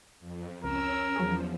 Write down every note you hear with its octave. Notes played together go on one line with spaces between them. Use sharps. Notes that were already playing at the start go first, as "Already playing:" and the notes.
F2
C#2 C#4 A#4 E6
E2 F3 F#3 C#4 G#4